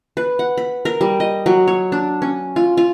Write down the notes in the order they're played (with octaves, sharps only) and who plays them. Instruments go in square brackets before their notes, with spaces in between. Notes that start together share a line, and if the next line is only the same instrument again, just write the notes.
[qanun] B4
F#5
B5
A#4
G3
D#5
F#3
C#5
D4
C#4
F4
F4